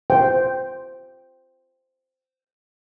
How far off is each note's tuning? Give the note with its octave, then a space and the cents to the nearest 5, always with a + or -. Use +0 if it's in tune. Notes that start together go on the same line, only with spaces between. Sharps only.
C5 -10 G5 +0